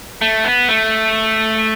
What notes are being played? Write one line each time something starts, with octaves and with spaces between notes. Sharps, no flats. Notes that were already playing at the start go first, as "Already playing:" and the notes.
A3
B3
A3